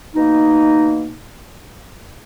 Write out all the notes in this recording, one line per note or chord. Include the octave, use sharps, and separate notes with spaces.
B2 A#3 D#4